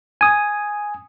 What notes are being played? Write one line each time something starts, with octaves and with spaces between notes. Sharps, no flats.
G#5 D#6